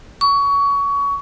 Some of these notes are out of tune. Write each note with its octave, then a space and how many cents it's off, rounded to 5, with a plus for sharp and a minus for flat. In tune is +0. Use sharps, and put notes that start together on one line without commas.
C#6 +25